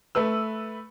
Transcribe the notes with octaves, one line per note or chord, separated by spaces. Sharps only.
A3 B4 E6